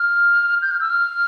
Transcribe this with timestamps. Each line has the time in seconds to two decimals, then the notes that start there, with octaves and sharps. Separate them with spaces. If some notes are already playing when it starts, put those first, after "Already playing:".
Already playing: F6
0.62 G6
0.71 F6
0.80 E6
0.90 F6